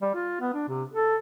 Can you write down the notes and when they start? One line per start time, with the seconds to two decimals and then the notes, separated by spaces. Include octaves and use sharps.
0.02 G3
0.15 F4
0.41 B3
0.54 D4
0.69 C3
0.93 A4